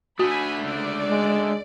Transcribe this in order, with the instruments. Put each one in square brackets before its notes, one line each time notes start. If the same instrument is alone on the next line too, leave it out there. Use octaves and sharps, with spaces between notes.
[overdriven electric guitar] D3 A3 [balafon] F#4 [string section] G#5 B5
[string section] C#2 D5
[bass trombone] G#3